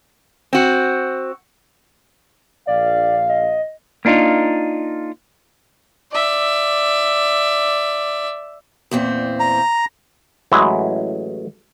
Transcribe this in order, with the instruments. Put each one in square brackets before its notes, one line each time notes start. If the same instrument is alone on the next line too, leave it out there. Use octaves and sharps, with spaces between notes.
[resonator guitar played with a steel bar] C4 F#4
[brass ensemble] A#1 F5 [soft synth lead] D5
[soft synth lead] D#5
[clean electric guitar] A#3 D4 D#4 F4 A#4
[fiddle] D5 E5
[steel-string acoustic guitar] E2 A#2 C4
[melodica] A#5
[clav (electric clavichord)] A1 F#3 G#3 E4